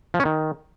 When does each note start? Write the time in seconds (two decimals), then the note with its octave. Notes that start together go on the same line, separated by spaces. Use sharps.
0.14 F3
0.20 C#4
0.25 D#3